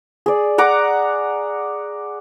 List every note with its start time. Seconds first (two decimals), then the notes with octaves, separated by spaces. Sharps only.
0.26 G#4 D5
0.58 F#5 A#5 D6